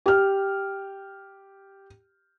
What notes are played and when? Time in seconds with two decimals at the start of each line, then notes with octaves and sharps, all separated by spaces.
0.06 G4 F6